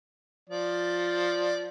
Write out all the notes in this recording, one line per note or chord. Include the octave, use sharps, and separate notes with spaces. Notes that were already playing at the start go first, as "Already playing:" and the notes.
F3 D5